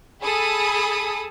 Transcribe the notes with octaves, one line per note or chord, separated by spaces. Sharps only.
G#4 A4 B5 D#6